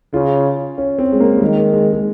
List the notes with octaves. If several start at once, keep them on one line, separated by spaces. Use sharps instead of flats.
C#3 F4
C#4
C4
G#3
A#3
G3
D#3 G#3
G#3
G#3